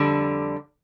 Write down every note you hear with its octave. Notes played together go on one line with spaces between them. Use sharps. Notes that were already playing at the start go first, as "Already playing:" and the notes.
Already playing: F2 D3 G3 D4